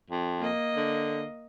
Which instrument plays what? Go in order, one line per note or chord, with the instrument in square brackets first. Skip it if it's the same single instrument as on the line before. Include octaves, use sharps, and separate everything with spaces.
[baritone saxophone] F2
[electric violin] A#3 D#5
[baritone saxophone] D3